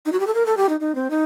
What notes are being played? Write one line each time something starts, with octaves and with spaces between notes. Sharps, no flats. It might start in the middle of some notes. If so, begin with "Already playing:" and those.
D#4
F#4
G4
A4
A#4
A4
G4
D#4
D#4
C4
D#4